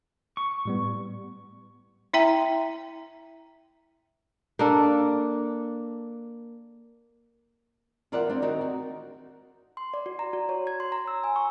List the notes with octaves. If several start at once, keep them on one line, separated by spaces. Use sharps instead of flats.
C#6
A2 G3 B3
E4 E5 G5 A#5
A#3 D4 A4
E2 F4 A#4 D5 E5 F#5
B3 C4 D4
D#3 C4 D#4 F#4 A#4
F#4
C6
D5
F#4
A#5
F#4
C#5
G#6
C6
A#5
E6
G#5
C#6